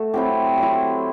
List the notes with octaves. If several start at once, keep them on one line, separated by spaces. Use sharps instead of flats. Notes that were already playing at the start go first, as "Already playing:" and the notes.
Already playing: A3 F#4 A4
F#3 C4 E4 G4
F#3 C4 E4